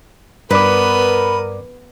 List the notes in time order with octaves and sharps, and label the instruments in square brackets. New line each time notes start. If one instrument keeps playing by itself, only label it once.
[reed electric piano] G2 D5 D6 [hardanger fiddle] B3 D#6 [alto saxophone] A#4 [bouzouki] B4